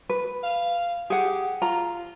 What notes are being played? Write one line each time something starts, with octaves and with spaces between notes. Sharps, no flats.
B4
F5
G4 G#4 F#5
F4 A#5